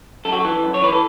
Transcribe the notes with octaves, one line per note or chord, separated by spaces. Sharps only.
F#2 A4
F#4
E3 A4
F#2
C#5
E3 B4
A4